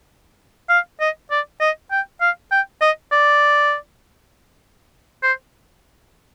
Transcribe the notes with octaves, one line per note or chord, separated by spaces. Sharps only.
F5
D#5
D5
D#5
G5
F5
G5
D#5
D5
C5